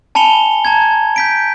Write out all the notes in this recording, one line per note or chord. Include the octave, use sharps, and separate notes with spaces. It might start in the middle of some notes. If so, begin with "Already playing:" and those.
G#5 A5 B5 C#7 F7 G7
A5 A#5 G#6
G6 B6 D7